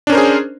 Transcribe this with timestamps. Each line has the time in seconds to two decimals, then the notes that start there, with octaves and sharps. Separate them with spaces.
0.07 D4
0.10 C#4
0.12 A#4
0.15 C5
0.17 G#4